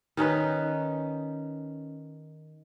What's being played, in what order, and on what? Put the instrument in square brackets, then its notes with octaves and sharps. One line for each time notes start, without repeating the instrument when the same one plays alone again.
[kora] D#3 C#4 D#4 B4